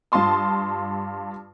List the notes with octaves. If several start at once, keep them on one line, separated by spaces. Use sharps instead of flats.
G2 F4 A5 C6 D#6